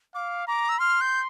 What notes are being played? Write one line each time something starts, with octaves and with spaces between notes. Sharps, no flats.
F5 D6
A#5 D6
E6
C6 F6
G6